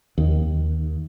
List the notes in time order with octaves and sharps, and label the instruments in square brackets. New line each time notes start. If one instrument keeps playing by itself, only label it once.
[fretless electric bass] D#2